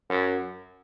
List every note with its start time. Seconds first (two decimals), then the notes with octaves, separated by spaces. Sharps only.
0.09 F#2